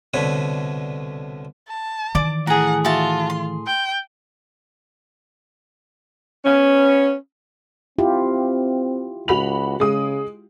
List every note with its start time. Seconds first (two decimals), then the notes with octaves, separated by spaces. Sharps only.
0.14 C2 B2 D3 B4 C#5
1.68 A5
2.15 D#3 E3 D5 D6
2.47 A2 G#4 F#5 G#5 A#5
2.85 F4 F#4 E5 A5
3.30 C6
3.66 G5
6.45 B3 C#4
7.98 C4 E4 F4 G4
9.28 C#2 F#4 B5 F7
9.80 C#3 G#3 D#6